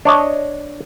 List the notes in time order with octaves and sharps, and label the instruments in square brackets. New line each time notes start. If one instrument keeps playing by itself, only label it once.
[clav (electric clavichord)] D4 C#5 D#5